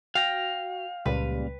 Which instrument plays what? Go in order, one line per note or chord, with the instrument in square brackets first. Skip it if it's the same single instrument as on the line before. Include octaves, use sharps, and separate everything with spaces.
[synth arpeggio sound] F#4 [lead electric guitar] F5 [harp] G5 F6 A#6
[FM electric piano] C#2 [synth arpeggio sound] A#2 C#3 G3 [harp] B4